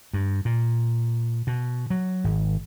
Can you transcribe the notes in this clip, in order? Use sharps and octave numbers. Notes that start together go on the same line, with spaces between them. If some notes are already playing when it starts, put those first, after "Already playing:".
G2
A#2
B2
F#3
G#1